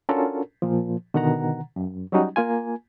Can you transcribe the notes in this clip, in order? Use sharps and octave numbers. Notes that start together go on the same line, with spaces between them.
C#4 D4 F4 F#4 A4 A#4
A#2 F3
B2 D3 D#3 F#5 A#5
F#2
F#3 G3 C#4 D#4 F#4
A#3 F4 G#5